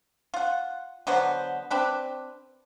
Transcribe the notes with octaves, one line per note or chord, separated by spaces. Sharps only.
F4 F#5
D3 F#3 B3 C5
C4 D4 B4